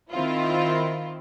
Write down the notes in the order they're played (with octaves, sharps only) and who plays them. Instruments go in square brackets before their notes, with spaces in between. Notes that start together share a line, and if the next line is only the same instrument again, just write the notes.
[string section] D#3 C4 E4 F4